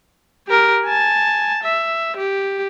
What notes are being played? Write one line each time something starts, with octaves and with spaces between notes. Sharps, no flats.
G4 A#4
G#5 A5
E5
G4